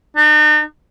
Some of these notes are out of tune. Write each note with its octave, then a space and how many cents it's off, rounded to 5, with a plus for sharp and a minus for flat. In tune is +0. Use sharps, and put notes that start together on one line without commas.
D#4 -45